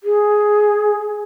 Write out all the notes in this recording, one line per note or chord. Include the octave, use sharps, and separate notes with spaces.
G#4